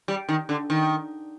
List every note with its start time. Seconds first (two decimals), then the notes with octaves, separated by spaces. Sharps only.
0.08 G3
0.29 D#3
0.49 D3
0.70 D#3